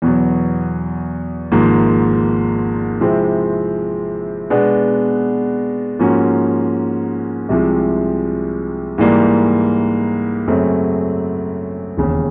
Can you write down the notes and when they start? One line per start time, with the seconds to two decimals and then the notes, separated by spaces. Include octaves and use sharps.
0.02 E2 B2 F#3
1.52 G#1 G#2 F3 A#3
3.01 C3 F3 G#3 C4 E4
4.50 B2 G#3 B3 D4
5.99 G#2 F3 A#3 C#4 F#4
7.49 C2 C3 F3 G#3
8.98 G#2 E3 G3 A#3
10.48 F#2 C#3 F#3 A3 C4
11.98 E1 D#2 C#3